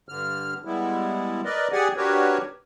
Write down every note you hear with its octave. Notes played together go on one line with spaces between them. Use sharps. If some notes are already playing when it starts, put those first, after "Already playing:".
G2 D3 F6
G3 G#3 B3 E4
A#4 B4 D5 D#5
G4 G#4 D5 F#5 G#5
D4 F#4 G4 A#4 B4 C#5